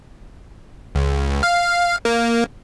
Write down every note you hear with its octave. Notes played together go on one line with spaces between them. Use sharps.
C#2
F5
A#3